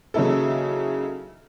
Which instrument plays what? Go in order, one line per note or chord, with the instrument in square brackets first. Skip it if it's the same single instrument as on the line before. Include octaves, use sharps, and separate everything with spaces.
[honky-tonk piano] C#3 F#3 A#3 D#4 E4 A4